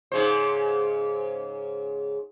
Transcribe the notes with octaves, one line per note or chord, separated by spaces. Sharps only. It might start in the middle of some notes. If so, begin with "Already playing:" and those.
G#2 C#3 C5